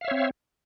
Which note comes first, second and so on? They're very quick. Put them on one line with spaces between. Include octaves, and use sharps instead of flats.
F5 E5 C#5 C4